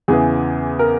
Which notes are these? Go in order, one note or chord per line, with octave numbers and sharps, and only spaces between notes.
E2 C#3 E3 B3 G#4
A#4